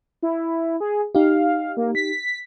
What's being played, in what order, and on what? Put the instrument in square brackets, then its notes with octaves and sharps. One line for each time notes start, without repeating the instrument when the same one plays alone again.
[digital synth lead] E4
G#4
[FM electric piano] D#4 G4 [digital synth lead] F5
[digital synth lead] A#3
B6